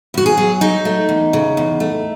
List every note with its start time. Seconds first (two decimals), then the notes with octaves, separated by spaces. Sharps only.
0.14 E2 F#4
0.26 G#4
0.37 F#3
0.61 F#3 D#4
0.85 A3
1.09 E2
1.33 C#3
1.57 E2
1.80 A3